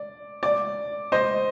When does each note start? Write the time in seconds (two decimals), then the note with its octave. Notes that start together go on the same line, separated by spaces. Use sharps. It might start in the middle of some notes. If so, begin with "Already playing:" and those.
Already playing: D5
0.43 D5
1.12 C5 D#5